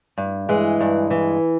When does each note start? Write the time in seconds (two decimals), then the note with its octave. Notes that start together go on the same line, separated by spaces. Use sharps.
0.18 G2
0.49 E3 G#3
0.80 G2
1.10 E3